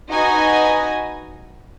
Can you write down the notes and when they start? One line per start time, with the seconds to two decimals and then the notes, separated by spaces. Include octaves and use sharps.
0.10 D#4 F#4 B4 D#5 G#5